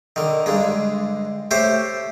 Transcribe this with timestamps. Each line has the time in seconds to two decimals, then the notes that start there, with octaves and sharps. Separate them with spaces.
0.16 D3 D#3
0.46 G2 D3 G#3
1.51 A3 G4 C5 C#5